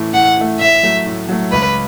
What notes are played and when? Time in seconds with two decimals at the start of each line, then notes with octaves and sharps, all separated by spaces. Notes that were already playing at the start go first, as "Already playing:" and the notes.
Already playing: A2 E3 A3
0.13 A2 F#5
0.37 E3 A3
0.60 A2 E5
0.83 F#3 A3
1.06 A2
1.28 F#3 A3
1.52 C#2 B4